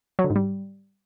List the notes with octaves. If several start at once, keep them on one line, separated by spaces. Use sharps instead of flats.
F#3
D3
G#2
G3